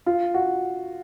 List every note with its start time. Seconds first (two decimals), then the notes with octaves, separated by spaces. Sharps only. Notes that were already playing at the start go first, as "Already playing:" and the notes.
0.06 F4
0.34 F#4